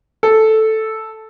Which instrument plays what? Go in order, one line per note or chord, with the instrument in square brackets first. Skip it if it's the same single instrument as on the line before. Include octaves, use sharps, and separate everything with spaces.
[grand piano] A4